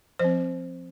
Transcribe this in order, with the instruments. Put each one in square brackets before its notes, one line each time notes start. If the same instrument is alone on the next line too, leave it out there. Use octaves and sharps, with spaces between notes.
[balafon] F3 C4 C5